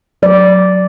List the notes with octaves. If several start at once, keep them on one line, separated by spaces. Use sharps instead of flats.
F#3 D5